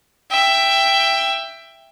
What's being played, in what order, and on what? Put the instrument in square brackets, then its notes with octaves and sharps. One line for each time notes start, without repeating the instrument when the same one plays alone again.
[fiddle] E5 G5